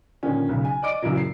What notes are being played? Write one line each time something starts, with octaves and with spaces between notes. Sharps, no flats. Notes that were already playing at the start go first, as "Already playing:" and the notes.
A#2 D3 D#3 F3 C#4
B1 C#3
G#5
D5 D#5 D6 D7
F#2 A#2 C#3 E3 F#3
C7